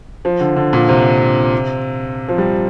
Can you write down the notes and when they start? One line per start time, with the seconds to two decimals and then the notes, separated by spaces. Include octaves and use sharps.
0.25 F3
0.41 D3
0.56 D3
0.73 A#2
0.89 C3
2.29 F3
2.38 G3